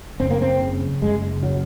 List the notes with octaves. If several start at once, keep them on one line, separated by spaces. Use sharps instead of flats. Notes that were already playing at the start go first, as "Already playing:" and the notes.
F#1 C4
A#3
C4
C#3
F#1 G#3
C#3 F#3